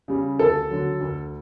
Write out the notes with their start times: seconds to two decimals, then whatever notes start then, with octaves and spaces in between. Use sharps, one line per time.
0.08 C#3 G3
0.39 D2 A4
0.70 D3 F#3
1.01 D2